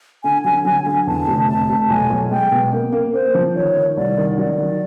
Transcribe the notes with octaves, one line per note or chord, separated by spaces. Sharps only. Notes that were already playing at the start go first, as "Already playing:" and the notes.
D3 G#5
F#3 G#5
F#3 G#5
D3 G#5
E2 A5
F1
C3 A5
F1
B1 G#5
B1
G#3 G5
B2
A#3
A#3
A#3 C5
F3
D#3 C#5
D#3
C2 D5
D#3
F#3 D5
D#3